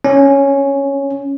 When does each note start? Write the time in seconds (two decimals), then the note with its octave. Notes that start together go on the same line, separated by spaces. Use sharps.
0.05 C#4